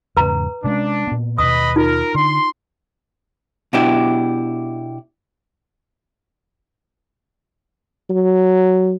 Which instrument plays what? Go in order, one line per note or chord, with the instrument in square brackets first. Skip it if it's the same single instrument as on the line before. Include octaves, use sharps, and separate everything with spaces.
[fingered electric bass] E2 G#2 C#3 [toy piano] B4 A#5
[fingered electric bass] C3 G#3 C#4 [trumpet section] D4
[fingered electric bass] A#2 B3
[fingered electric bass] D#2 B2 [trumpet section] B4 D#5 B5 [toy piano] D#6
[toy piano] D#4 F4 [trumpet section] A#4
[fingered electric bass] D3 [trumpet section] C6
[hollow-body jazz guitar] B2 D4 E4 G4
[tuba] F#3